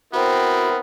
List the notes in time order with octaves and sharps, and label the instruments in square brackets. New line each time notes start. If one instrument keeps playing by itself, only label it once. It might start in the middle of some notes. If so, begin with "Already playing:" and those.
[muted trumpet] B3 [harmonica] C4 E4 [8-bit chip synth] F#4 C5 G5 [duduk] A#4